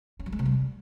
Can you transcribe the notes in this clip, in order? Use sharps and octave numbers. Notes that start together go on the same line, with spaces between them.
C#4
F#3
G#3
C3
G3